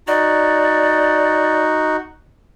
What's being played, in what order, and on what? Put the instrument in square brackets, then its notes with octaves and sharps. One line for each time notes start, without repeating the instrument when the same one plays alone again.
[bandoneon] D#4 F#4 [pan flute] D5